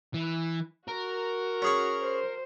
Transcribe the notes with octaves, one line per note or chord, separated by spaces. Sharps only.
E3
F#4 A#4
C#4 G#4 C#5
C5